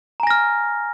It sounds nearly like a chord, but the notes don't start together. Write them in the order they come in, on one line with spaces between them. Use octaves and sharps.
A#5 G#5 A#6 F6